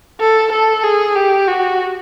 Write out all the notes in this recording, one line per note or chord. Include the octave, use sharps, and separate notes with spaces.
A4
A4
G#4
G4
F#4